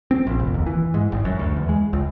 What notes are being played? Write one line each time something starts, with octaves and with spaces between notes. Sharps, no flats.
C4
A#1
F1
D#2
E3
G#2
G#1
F#2
D2
E2
G#3
C#2